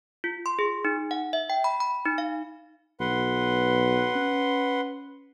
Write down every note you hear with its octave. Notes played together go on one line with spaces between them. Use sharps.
F4
C6
G#4
D#4
F#5
E5
G5
B5
B5
D#4
F5
B1 B4 F#5 C6
C#4